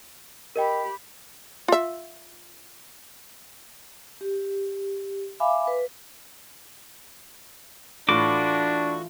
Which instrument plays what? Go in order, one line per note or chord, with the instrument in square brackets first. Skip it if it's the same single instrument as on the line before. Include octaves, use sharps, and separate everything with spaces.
[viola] G4 B5 [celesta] A#4 D#5 G5
[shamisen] F4 E5
[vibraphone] G4
E5 F5 G#5 B5 D6
B4
[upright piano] A2 [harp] E3 F4 A5 [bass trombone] D4 [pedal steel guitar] F#4 A4 D6